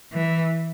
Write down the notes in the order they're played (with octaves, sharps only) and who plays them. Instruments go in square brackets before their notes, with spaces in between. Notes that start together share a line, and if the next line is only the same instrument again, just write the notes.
[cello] E3